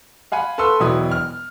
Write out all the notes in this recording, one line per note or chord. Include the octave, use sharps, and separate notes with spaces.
F5 F#5 G#5 B5
A4 B4 C6 C#6 E6
E1 B2 F#3 E4 D#6
F6